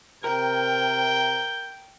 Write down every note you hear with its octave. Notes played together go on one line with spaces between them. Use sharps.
C3 A#4 G5 G6